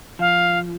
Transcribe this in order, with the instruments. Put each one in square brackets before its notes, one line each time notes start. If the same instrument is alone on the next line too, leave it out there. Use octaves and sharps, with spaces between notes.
[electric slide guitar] F3 [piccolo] F5